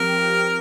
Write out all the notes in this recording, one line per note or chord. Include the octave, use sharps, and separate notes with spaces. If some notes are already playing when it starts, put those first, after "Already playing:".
Already playing: F3 C4 G4 A#4
F3 C4 G4